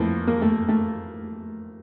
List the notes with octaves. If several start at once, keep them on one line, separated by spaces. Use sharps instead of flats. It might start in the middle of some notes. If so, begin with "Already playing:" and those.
Already playing: F2 E3 A3 A#3
A#3
A3
A3